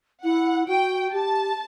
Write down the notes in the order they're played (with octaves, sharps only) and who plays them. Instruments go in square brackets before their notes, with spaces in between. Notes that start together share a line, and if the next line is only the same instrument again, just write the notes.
[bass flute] E4 [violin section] F#5
[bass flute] F#4 [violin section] G5
[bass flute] G4 [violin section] A5